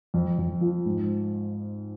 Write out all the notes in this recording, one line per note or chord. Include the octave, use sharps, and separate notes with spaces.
F2
F2
F3
G#2